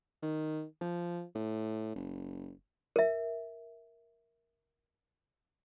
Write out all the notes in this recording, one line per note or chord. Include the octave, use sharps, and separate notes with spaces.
D#3
F3
A2
F#1
A#4 E5